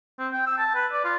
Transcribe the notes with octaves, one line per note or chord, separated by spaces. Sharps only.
C4
G5
E6
A5
B4
D5
F4